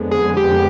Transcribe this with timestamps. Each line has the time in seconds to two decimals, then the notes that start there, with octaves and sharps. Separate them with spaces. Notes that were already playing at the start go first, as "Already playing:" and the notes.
Already playing: F2 D3 G#3 B3
0.11 G#4
0.37 G4